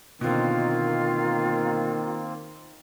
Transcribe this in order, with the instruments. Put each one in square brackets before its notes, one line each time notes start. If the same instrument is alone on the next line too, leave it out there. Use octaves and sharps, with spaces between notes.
[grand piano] B2 D3 [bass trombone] D#3 [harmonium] A#3 C4 [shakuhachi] F4